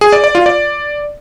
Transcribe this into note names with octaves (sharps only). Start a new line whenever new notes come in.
G#4
D5
D5
F4
D5